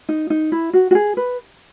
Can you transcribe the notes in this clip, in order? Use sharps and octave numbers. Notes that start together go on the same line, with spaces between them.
D#4
D#4
E4
F#4
F#4
G#4
B4